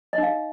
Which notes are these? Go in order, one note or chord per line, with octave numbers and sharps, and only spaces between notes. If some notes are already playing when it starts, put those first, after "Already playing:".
D#4 D#5 F5